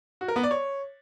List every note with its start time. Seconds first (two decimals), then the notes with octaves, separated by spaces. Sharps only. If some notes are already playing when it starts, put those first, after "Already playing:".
0.21 F#4
0.28 A#4
0.36 B3
0.43 D5
0.51 C#5